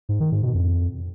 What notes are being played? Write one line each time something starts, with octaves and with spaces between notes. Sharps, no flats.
G#2
D#3
G#2
B2
F2